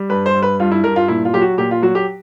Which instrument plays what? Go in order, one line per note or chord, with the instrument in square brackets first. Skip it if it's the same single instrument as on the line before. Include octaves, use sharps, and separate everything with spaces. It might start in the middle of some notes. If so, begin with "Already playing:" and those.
Already playing: [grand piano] G3
G2 B4
C5
G2
B4
G2 F4
E4
G2 A#4
F4
A#2 E4
F4
F#3 G4
F#4
A#2 G4
F4
F#3 F#4
G4